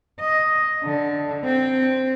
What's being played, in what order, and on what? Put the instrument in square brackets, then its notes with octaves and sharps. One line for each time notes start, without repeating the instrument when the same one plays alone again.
[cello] D#5
D3
C4